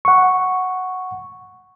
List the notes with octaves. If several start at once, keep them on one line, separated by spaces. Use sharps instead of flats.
F#5 C#6